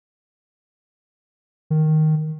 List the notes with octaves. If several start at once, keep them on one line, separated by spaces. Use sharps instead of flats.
D#3